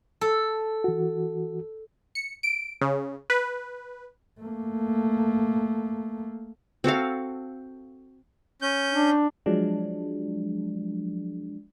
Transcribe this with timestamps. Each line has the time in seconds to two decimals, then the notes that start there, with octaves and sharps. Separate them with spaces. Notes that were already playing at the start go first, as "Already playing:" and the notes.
0.21 A4
0.84 E3 F#4
2.15 C#7
2.43 D7
2.81 C#3
3.30 B4
4.41 A3 A#3
6.84 C4 F#4 A4 F5
8.62 C#4 G6
8.92 D4
9.46 F3 F#3 G#3 D4